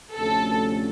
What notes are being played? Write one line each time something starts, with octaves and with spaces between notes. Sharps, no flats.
D2 C3 F3 A3 C#4 A4